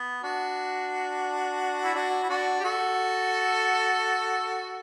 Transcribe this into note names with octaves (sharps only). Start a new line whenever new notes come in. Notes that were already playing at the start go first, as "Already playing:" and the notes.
Already playing: B3
D4 F#4
E4
D4 F#4
E4
D4 F#4
G4
F#4 A4